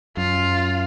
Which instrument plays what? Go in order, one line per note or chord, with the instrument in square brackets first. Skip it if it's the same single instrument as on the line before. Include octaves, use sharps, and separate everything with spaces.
[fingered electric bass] F#2 [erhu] F4